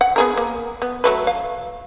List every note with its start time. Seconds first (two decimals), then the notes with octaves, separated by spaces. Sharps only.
0.01 F#5
0.16 B3 G#4 A#4
0.37 A#3
0.82 B3
1.04 F#3 A3 B4
1.27 F5